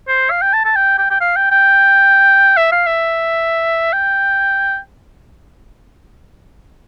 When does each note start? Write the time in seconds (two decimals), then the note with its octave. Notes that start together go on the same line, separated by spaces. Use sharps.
0.08 C5
0.31 F5
0.42 G5
0.53 A5
0.65 A5
0.76 G5
0.98 G5
1.11 G5
1.21 F5
1.36 G5
1.51 G5
2.57 E5
2.72 F5
2.87 E5
3.93 G5